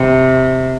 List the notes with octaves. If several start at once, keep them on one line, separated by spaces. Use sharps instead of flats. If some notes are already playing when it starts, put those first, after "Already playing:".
Already playing: C3